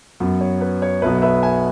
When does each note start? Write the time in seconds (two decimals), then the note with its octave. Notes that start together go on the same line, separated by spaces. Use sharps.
0.20 F#2 F#3 B3
0.41 C#5
0.61 B4
0.82 C#5
1.02 B1 B2 F#3 B3 B4 E5
1.22 B4 E5
1.43 E5 G#5